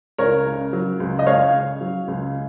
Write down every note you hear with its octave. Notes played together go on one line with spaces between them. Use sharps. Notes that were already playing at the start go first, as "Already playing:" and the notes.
C#2 A#4 C#5
C#3
F#3
C#2
D#5
C#2 C#5 F5
C#3
F#3
C#2